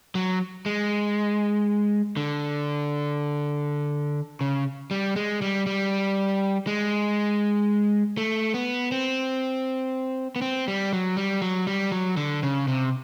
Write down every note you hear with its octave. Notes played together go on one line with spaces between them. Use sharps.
F#3
G#3
D3
C#3
G3
G#3
G3
G3
G#3
A3
B3
C4
B3
C4
G3
F#3
G3
F#3
G3
F#3
D3
C#3
C3